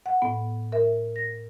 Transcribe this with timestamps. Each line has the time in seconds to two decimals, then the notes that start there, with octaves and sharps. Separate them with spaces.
0.06 F#5
0.22 A2 B3
0.72 A#4 E5
1.16 A#6